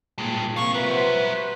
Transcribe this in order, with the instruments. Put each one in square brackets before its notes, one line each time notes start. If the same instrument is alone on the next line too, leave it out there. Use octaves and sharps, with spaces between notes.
[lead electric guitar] G2 G#3 [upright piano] A#2 A#3
[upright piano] C3 F3 A#3 [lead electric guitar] C5 F5 [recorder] C#6
[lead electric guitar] F#3 E5 [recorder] B4
[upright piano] C5 F#5